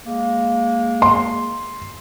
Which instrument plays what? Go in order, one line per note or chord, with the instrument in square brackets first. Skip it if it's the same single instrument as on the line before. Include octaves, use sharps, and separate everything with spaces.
[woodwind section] G#3 A#3
[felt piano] C6